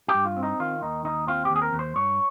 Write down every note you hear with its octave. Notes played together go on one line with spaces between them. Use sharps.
G4
G2
F4
C4
D#4
D#3 F4
D#2 D#4
D#2 D#4
C4 F4
G4
D#2
G#4
A#4
D#2
C5
G2 C#5